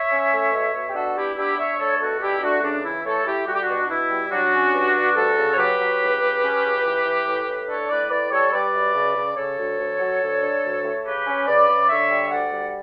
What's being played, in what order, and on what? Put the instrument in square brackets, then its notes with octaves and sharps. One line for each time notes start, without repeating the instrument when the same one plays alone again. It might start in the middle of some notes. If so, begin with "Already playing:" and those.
Already playing: [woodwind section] C#5 E5
C#4
A3
B2
B2
G4
D4 F#4 A4
B3 E4 G4
D4 E4 G4
D4 C#5 E5
A3 A4 C#5
B2 F#4 A4
D4 E4 G4
A3 D4 F#4
C#2 D4
E3 E4
A3 A4 C#5
A3 E4 G4
G3 F#4
G4
D4 F#4
B2
B2 E4
G3
F#3 D4 F#4
C#4
G2
G2
D2 F#4 A4
C#3
C#5
F#3 G4 B4
F#3
C#2
C#2
C#4
C#2
E3
E3
A2
A2
D4 A4 C#5
A2 B4 D5
A2 B4 D5
G3 A4 C#5
G3 B4 D5
F#2
C#3
C#3
C#3 A4 C#5
D2
D2
F#3
D2
D3
D2
A3
C#3 G4 B4
C#4
C#3 B4 D5
C#3
D3 C#5 E5
G3
D2 D5 F#5
G3